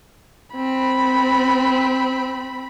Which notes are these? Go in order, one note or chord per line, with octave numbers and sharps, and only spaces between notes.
C4 B5